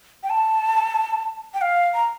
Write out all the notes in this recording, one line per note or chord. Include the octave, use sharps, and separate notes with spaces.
G5
A5
G5
F5
A#5